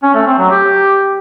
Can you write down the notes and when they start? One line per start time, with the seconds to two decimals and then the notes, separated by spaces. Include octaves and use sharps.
0.03 C#4
0.15 A3
0.27 C4
0.38 F#3
0.50 G4